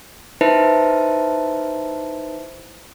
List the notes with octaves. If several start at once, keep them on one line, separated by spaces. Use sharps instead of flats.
D#4 E4 B4 C5 E5 A5